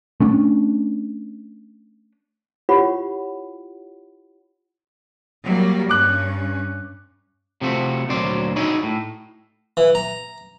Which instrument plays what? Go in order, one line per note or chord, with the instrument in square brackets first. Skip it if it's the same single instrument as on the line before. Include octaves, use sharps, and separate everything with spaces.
[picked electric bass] A3 C#4 D4
[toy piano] E4 F4 G4 C#5 F#5 B5
[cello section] F#3 G3 A#3
[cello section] G2 C#4 [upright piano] D6 F#6
[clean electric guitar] C3 F3 A3 F#4
D2 A#2 F#3 C5 D5
D#4 E4 F#4 G#4 C#5 D5
A2
[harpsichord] E3
A#5